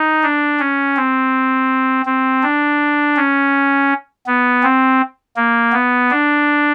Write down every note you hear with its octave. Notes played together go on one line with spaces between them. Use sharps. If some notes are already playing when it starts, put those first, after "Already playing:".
Already playing: D#4
D4
C#4
C4
C4
D4
C#4
B3
C4
A#3
B3
D4